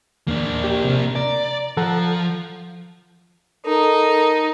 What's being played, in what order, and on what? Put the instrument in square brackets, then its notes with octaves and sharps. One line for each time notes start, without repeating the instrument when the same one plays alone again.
[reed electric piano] D#2 [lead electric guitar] A#3 D4
[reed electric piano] G4
C3
[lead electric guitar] D5 [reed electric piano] A#5
[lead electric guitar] F3 [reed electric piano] A4 F#5 A#5
[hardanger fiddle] D#4 [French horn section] A4 A#4